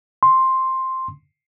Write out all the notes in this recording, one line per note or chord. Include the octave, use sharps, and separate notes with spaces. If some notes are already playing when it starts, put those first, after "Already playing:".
C6